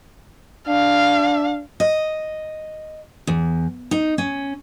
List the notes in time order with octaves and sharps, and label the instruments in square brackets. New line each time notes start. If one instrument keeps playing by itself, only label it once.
[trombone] D4 [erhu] F5
[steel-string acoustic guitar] D#5
E2
D#4
C#4